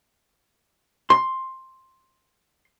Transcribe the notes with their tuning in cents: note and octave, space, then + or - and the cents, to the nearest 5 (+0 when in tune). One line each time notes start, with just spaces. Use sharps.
C6 +10